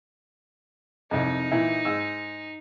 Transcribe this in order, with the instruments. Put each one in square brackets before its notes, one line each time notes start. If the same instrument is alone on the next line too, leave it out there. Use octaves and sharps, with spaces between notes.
[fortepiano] C2 F2 [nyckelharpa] D#4
[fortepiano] A#2 E3 E4
G#2 E6